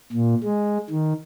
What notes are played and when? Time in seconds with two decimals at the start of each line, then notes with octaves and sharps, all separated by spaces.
0.13 A#2
0.43 G#3
0.90 D#3